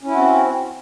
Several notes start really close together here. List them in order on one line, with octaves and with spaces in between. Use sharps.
C#4 E4 F#4 C4